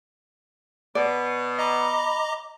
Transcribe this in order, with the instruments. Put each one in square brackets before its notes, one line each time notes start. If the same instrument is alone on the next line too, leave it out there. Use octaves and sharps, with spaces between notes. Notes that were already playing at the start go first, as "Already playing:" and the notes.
[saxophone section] B2 B3 [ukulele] D5
[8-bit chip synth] D#5 A#5 D6 [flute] B5